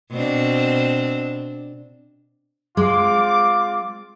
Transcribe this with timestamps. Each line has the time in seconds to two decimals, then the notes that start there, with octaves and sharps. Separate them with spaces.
0.11 B2 C4 D4
2.77 G#3 C4 F4 D6